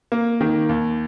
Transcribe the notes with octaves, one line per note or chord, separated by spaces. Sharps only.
A#3
D#3
D#2